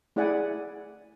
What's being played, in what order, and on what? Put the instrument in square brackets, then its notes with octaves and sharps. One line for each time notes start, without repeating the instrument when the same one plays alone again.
[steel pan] A3 E4 G#4 D5 F#5 G#5